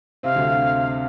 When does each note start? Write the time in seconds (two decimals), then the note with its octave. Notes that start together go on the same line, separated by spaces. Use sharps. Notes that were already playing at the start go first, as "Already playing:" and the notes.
0.23 C3 C4 F5
0.35 D2 D3